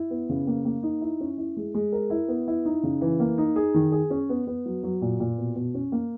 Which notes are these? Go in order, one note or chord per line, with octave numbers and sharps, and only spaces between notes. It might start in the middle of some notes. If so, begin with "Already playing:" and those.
Already playing: E4
B3
C#3
A#3
A#3
D#4
E4
C#4
E4
G#3
G#3
A#4
E4
B3
E4
D#4
C#3
E3
A#3
D#4
G#4
D#3
G#4
C#4
B3
B3
F#3
F#3
A#2
A#2
B2
B2
C#4
A#3